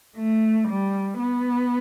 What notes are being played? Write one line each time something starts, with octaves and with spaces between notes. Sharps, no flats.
A3
G3
B3